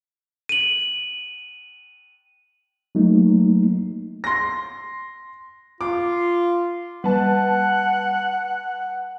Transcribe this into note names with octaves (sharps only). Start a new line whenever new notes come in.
D#7 F#7
F#3 A3 A#3 D#4
C6 A#6
F4 D6
G3 B4 F#5 A5